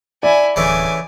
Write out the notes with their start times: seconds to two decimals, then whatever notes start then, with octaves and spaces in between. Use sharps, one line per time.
0.23 E4 D5 G#5
0.56 D1 C#3 E3 A3 G#5 D6